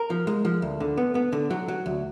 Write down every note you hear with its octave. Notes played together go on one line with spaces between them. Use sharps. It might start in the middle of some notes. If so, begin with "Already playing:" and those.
Already playing: A#4
F3
G#3
F3
D2
D3
B3
B3
D3
F#3
F#3
D2